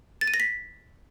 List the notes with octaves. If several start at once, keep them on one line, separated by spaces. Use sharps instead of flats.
A6
D#7
A#6
B6